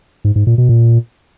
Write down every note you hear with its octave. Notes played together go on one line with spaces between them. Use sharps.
G#2
G#2
A#2
B2
A#2